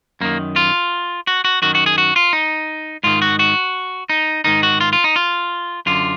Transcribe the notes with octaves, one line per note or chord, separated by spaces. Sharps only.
F#2 D#3 A#3
F4
F#4
F#4
F#2 D#3 F#4
F#4
G#4
F#4
F4
D#4
G#2 D#3 F4
F#4
F#4
D#4
G#2 D#3 D#4
F#4
F4
F4
D#4
F4
F#2 D3 F4